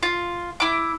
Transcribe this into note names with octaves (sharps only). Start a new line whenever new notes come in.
F4
E4 D6